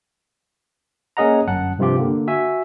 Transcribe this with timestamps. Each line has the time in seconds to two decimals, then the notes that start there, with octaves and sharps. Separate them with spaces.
1.17 A#3 C#4 G#4 D#5 F#5 A#5
1.48 G1 F#2 F#5 A5
1.79 G2 C3 F3 F4 G4
1.98 D3 A#3
2.27 F#4 E5 G#5